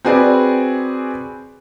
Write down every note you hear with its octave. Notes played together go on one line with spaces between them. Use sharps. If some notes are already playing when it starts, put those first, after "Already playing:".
C4 F#4 G#4 B4 D5